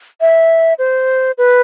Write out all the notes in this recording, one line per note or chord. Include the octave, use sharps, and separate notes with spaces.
E5
C5
B4